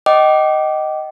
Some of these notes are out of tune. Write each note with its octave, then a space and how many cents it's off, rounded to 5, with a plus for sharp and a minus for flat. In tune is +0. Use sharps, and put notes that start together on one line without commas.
D#5 +0 G5 -35 D6 +0